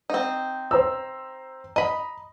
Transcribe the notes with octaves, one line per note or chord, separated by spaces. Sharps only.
C4 D#4
C5 A#5 E6
D#5 A#5 B5